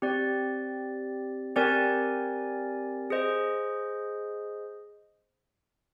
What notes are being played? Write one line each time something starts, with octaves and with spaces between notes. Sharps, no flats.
C4 G4 D5
C4 G4 A#4 D5 G#5
G#4 C5 D#5